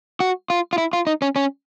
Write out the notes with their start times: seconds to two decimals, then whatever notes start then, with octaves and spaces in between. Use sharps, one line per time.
0.20 F#4
0.50 F4
0.73 F4
0.78 E4
0.93 F4
1.07 D#4
1.22 C#4
1.36 C#4